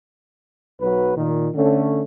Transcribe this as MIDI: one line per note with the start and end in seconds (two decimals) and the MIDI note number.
0.81 1.15 35
0.81 1.15 54
0.81 1.15 71
1.16 1.48 46
1.16 1.48 51
1.55 2.01 50
1.55 2.01 57
1.55 2.01 61